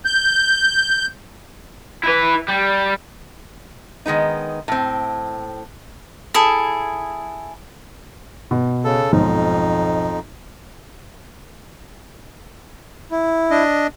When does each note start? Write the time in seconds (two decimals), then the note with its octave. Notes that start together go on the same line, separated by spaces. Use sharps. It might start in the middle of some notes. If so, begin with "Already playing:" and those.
0.05 G6
2.03 E4 B4
2.49 G3
4.06 D#3 G#3 B3 D#4
4.68 A2 C4
6.34 E4 G#4 A4
8.51 B2
8.85 C#3 A4
9.12 B1 F2 G#2 F3 D#4
13.11 E4
13.51 D4 D#5